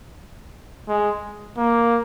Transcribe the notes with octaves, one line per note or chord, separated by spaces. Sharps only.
G#3
A#3